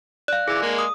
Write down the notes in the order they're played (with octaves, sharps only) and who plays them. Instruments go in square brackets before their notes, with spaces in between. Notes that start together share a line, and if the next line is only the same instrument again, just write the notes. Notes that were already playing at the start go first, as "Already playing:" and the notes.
[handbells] D5 F5 [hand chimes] F#6
[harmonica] E3 D6 [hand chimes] G#4
[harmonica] G#3 A#3
[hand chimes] D#6